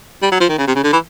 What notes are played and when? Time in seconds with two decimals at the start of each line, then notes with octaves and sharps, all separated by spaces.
0.22 G3
0.32 F#3
0.40 F3
0.49 D#3
0.58 C#3
0.67 C3
0.75 C#3
0.84 D3
0.93 E3